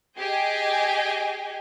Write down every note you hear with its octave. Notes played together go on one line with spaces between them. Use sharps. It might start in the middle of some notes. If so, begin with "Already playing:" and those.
G4 G#4 D#5 G5 G#5